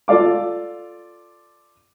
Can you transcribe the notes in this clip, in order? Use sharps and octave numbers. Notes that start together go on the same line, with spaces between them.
F4 A4 D5 F5 D6